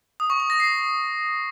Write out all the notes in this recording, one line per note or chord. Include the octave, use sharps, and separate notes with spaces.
D#6
C#6
C#6
A#6
C7